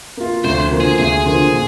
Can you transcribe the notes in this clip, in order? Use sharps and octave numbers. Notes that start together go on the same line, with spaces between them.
A#3 F4
D2 C5
D3 F3 A#3
G#4
D2 G#4
D3 F3 A#3
A#2